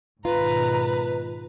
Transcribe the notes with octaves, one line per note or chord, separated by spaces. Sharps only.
G#2 B2 D#3 F4 B4 A#5